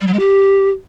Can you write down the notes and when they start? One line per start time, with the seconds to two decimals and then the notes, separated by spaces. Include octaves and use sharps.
0.01 G3
0.07 F#3
0.13 G#3
0.19 G4